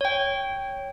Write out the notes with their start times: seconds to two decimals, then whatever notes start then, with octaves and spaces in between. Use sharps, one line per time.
0.01 C#5 G5